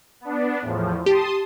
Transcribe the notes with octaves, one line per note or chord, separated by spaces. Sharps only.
B3 D4
E2 A2 F3
G4 A5 C6 D#6